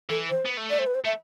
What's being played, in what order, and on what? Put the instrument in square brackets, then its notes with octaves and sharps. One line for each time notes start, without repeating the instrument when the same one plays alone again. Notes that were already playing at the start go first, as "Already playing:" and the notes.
[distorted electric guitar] E3 [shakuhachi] A4
[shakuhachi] C5
[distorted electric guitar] B3
A3
[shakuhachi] D5
C5
B4
C5
[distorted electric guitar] A3 [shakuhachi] E5